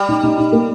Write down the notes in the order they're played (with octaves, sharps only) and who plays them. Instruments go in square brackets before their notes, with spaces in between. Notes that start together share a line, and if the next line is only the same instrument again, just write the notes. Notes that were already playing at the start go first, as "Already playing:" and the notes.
Already playing: [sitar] G3
[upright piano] D#4
D#4
D#4
A#3